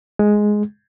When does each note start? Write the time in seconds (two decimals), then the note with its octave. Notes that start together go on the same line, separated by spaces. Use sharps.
0.19 G#3